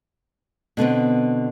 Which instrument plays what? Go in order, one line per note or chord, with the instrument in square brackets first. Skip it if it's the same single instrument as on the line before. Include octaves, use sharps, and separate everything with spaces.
[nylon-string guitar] B2 D3 B3 C4